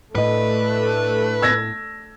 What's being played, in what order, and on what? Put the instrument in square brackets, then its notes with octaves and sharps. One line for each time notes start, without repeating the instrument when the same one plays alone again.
[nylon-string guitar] A2 D#5 [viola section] A3 D4 [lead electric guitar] B4
[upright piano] E6 G#6 A#6